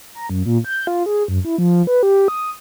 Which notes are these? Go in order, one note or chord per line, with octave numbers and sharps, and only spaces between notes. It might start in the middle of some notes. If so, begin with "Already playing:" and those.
A#5
F#2
A#2
G6
F4
G#4
F#2
E4
F3
B4
G4
D#6